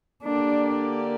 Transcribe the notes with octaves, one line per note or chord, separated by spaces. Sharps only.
D3 A#3 D4 G4 D5